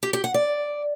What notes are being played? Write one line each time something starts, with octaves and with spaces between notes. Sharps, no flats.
G4
G4
F#5
D5